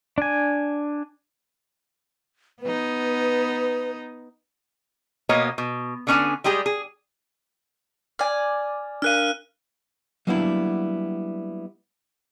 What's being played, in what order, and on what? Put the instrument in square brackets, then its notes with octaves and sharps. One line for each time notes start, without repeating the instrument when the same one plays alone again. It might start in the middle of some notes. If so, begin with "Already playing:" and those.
[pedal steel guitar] D4 G#5
[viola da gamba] B3 D#4 [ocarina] B4
[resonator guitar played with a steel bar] B2 A#3 B3 C#5 D#5
B2
D3 B3 C#4 D4 G#5
G3 G#3 G4 G#4
G#4
[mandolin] D5 G#5 [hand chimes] F6
[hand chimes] D4 A#4 F5 [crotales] F6 F#6 D#7
[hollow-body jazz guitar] F#3 G3 A#3 B3 D4 E4